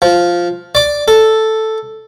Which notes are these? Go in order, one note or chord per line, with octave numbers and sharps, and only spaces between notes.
F3
D5 D6
A4